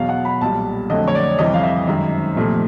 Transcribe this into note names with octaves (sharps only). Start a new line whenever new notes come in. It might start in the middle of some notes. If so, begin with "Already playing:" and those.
Already playing: E2 B2 F#3 F5
F#5
B5
B1 A#2 G3 A5
F2 D3 F#3 A3 D#5
C#5
D5
F2 C3 E3 G3 D#5
F5
E5
F#2 D#3 G#3
C2 A#2 F3 A3